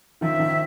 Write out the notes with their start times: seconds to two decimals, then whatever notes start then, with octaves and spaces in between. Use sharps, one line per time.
0.21 D#3 F3 E5
0.39 D#3 F3